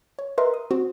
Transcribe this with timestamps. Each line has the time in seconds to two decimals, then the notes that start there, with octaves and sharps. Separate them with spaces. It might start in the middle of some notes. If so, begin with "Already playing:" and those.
0.19 C#5
0.38 A#4 B4 D#5 E5 A#5 C6
0.54 D#6
0.71 C4 F#4 C5